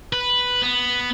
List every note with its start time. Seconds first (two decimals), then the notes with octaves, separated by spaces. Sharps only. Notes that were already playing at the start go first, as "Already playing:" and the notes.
0.13 B4
0.62 B3